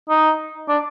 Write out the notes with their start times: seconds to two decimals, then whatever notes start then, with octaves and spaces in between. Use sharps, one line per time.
0.09 D#4
0.68 D4